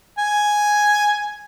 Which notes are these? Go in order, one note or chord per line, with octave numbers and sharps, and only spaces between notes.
G#5